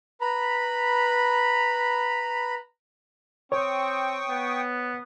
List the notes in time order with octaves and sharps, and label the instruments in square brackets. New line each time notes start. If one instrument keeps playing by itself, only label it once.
[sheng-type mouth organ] B4 A#5 B5
[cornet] C4 [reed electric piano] C#5 [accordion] G5 C#6 D#6
[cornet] B3